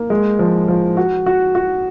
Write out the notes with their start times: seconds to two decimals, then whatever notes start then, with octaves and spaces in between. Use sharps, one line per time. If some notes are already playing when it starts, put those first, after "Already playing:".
Already playing: A#3
0.10 G#3
0.39 F3
0.68 F3
0.97 F#4
1.26 F#4
1.55 F#4